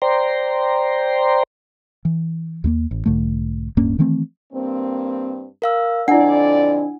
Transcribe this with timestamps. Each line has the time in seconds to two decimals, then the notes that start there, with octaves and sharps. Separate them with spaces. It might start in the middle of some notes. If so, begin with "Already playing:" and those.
0.02 C5 D5 G5 A#5 C6
2.05 E3
2.64 D#2 G#3 A#3
2.91 A1
3.06 B1 G#2 D3 A3
3.77 D1 G2 A#3 C#4
3.99 D#3 E3 A3 C4
4.53 G2 A#3 C4
5.62 A#4 F5 E6
6.08 F2 D3 D4 E4 D5 F#5 G#5